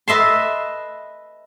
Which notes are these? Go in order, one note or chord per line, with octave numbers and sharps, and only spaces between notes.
B4 D#5 E5 A5 C6